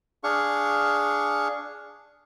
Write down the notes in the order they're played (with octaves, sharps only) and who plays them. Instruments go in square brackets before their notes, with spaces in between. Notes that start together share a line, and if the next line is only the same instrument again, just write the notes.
[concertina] D4 G#4 F5 C#6